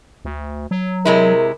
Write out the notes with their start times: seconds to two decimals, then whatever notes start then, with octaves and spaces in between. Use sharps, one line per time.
0.25 D2
0.71 F#3
1.05 C3 G#3 E4 A#4